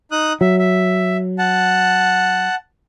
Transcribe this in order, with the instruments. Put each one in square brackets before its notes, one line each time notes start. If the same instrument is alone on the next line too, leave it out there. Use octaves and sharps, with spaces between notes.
[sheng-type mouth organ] D#4 D#6 F#6
[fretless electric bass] F#3 [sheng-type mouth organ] E5
[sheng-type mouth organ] E5
F#5 A5